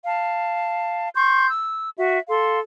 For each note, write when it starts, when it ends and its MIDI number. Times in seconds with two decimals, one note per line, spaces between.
0.06 1.09 77
0.06 1.09 81
1.15 1.48 84
1.15 1.48 85
1.15 1.48 91
1.49 1.89 88
1.97 2.19 66
1.97 2.19 76
2.29 2.60 69
2.29 2.60 77
2.29 2.60 84